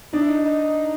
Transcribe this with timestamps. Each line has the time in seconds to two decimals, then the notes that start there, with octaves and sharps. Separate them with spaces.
0.13 D4 D#4
0.21 E4
0.29 D#4
0.45 D#4